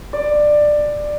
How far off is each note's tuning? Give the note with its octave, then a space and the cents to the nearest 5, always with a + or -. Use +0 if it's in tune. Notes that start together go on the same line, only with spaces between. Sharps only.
D5 +15